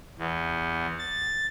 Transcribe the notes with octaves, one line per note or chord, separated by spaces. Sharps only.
E2
A6